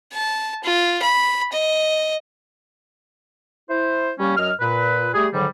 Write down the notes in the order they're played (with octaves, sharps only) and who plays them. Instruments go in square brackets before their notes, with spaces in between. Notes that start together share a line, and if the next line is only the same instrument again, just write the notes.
[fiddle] A5
F4
B5
D#5
[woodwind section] E4 C5
G3 A#3 C#4
F#2 F#3 D#5 F6
A#2 B4
G3 A3 G4 G#4
G#2 D3 D#3 F#3 G3